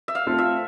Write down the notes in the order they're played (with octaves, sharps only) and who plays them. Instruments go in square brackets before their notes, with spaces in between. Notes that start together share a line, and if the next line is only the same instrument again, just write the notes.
[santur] E5
F5
[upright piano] A3 C4 F4 A4
[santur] E5